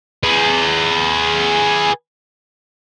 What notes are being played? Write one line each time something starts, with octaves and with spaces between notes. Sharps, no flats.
G#4 B4